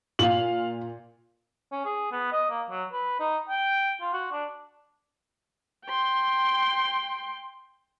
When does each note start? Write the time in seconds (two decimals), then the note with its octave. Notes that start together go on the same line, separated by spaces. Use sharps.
0.19 A#2 F4 F5 F#7
1.71 C#4
1.85 G#4
2.12 B3
2.32 D#5
2.50 A#3
2.70 F#3
2.92 B4
3.20 D#4
3.49 G5
4.01 F4
4.13 F#4
4.32 D4
5.86 G5 C6